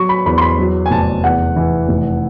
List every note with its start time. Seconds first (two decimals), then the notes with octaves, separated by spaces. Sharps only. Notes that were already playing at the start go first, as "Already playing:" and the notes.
Already playing: F#3 C#6
0.09 B5
0.26 E2 B5
0.38 C6
0.41 B5
0.59 F#3
0.86 G#5
0.91 F1 A5
1.24 E2 F#5
1.56 E3
1.89 F1